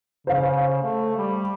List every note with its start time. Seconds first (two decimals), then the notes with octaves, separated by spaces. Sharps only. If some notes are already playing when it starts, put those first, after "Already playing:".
0.27 C#3 C5 F5
0.83 A3
1.17 G3